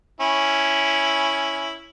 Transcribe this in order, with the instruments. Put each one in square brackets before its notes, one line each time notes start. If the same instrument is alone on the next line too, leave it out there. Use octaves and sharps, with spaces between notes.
[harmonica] C#4 E4